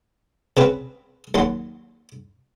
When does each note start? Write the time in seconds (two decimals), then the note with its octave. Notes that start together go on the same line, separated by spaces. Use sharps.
0.57 C#3 C4 B4
1.34 D#2 F#3 C6